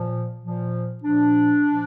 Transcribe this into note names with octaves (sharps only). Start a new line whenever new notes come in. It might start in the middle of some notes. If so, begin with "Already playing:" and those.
Already playing: A#2 F3
A#2 F3
A#2 F3 D4
A#2 F3